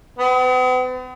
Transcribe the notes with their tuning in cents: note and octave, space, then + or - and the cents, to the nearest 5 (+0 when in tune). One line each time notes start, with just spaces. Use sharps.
B3 +45